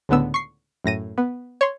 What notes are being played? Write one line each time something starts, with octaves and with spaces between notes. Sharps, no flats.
C#2 A2 D3 B3 E6
C#6 C7
F#2 A2 A#6 D#7
B3
C#5 C6